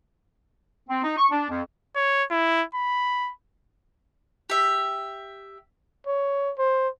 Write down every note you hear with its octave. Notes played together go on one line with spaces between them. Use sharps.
C4
D#4
C#6
D4
F2
C#5
E4
B5
G4 E5
C#5
C5